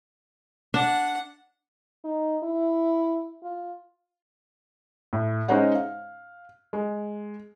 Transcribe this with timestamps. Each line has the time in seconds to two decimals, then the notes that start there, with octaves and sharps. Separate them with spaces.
0.74 D4 F#5
2.04 D#4
2.43 E4
3.43 F4
5.13 A2
5.48 G#3 C#4 D#4 C5 C#5 F#5
5.75 F5
6.73 G#3